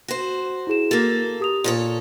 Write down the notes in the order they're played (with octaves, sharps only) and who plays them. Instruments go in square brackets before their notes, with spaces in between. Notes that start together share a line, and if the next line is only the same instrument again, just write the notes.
[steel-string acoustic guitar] F#4 C5
[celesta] E4 G#4 E7
[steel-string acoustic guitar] A#3 A4 [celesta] F#4 A6
[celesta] G4 D#6 F7
[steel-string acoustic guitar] A#2 A4 C#5 [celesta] F4